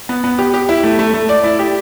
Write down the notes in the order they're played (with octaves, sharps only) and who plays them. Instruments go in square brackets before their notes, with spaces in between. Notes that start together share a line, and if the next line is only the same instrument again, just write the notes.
[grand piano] B3
B3
G4
G4
E4
A3
A3
A3
D5
E4
G4